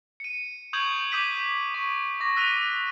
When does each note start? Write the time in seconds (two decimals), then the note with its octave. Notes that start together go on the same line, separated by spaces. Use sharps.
0.20 C#7 D#7
0.73 C#6 D#6 G6 G#6 F#7
1.12 D6 D#6 G6 B6 D#7
1.74 C#6
2.20 C#6 D6 A#6
2.37 E6 F#6 B6 D#7